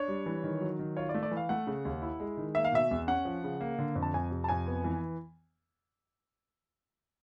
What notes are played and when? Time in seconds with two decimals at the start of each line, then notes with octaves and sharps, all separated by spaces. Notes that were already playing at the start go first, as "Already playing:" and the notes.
Already playing: D4 C#5
0.08 G3
0.26 E3
0.44 D#3
0.61 F#3
0.79 D#3
0.97 F4 C#5
1.09 D5
1.14 A3
1.23 D5
1.31 E3
1.37 F5
1.49 A3 F#5
1.67 C#3
1.85 D#2
2.02 E4
2.20 G#3
2.37 D#3
2.55 A#3 E5
2.65 F5
2.72 B2 E5
2.91 E2
3.07 C#4 F#5
3.25 F3
3.44 C#3
3.61 A#3
3.78 D3
3.95 F2
4.03 A5
4.14 F2 G#5
4.31 C3
4.44 A5
4.49 F2 G#5
4.67 B3
4.84 E3